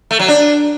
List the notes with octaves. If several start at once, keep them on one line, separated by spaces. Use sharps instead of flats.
A3
F#3
D4